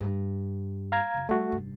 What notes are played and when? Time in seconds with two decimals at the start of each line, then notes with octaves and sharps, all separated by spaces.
0.01 G2
0.92 F5 A#5 G#6
1.14 F#2 C#3
1.29 G3 A3 F#4
1.52 F1 G2